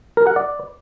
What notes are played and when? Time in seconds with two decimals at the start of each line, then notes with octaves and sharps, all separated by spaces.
0.17 A#4
0.27 F#5
0.36 D5